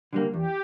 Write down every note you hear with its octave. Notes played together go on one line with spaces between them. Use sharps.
D3 G3 A#3
E2 G4